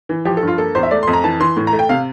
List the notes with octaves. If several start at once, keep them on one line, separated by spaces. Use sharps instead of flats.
E3
F3 G4
A4
G2 F4
A#3 A4
E2 C5
E5
A3 D5
F2 C6
A#5
E3 A5
E3 C6
A2
A#5
A3
G5
C3 F5